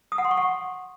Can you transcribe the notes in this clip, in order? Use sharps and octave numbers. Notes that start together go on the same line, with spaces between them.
D#6
F#5
C6
C#6
F#5